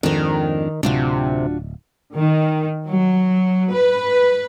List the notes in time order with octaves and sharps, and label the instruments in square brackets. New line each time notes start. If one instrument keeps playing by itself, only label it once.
[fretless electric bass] F2 G#2 [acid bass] D#3 [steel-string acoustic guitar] D4 A#4
[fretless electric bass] D1 [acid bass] C3 [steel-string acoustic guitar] D4 F4 F#4
[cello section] D#3
F#3
B4